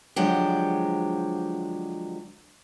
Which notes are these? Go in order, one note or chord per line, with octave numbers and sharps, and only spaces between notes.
D3 F3 F#3 G#3 G4